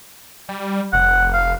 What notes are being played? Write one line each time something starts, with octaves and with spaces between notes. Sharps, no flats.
G3
F1 F#5
F5